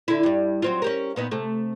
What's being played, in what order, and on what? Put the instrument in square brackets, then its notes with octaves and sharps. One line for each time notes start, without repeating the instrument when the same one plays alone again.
[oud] D3 E4
G2 G3
F#3 C4 F4
C#4 G4 A#4
A#2 B3 D#4
C3 A3